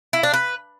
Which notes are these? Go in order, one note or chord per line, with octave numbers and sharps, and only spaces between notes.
E4
D4
B4